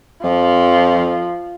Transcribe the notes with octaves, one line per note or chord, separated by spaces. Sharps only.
F2 F3